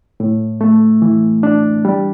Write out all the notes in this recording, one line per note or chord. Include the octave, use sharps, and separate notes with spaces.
A2
A3
E3
D4
G3